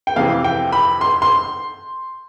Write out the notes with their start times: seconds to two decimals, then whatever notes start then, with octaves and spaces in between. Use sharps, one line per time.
0.07 G5
0.16 F2 C3 E3 F5
0.44 G5
0.72 B5
1.01 C6
1.22 C6